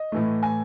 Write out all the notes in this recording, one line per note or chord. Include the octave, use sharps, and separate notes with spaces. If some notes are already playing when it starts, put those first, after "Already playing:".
Already playing: D#5
A2 E3 A3
G#5